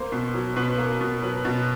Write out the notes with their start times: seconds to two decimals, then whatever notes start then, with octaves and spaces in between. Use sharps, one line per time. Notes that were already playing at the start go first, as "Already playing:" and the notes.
Already playing: A#3 C5
0.12 B2
0.34 F#3
0.56 B2 B4
0.78 A#3
1.01 B2
1.22 F#3 B4
1.45 B2